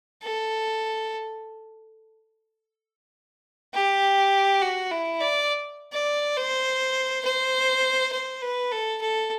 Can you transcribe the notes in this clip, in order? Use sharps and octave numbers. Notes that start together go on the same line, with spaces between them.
A4
G4
F#4
E4
D5
D5
C5
C5
C5
B4
A4
A4